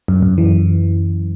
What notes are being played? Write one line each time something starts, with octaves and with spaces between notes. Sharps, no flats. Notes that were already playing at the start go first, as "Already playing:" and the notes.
F#2
F#2
E3